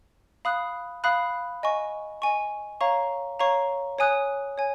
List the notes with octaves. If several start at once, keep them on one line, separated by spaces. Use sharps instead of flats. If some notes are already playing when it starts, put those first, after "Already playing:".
F5 B5 D#6 F#6
F5 B5 D#6 F#6
D#5 G#5 C#6
D#5 G#5 C#6
C#5 F5 A#5 C#6
C#5 F5 A#5 C#6
C#5 G#5 D#6 F#6
C#5 G#5